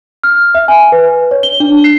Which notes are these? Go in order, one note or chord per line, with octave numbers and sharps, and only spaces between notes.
F6
E5
G#5
B4
C#5
G7
D4
C7